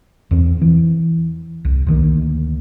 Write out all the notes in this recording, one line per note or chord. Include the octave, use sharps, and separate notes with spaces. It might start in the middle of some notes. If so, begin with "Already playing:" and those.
E2 C4
E3
C2
D2 D#3 F#3 A#3